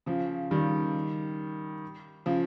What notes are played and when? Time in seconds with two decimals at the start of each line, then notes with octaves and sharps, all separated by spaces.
0.06 C#3 F3
0.51 D#3 G3
2.26 C#3 F3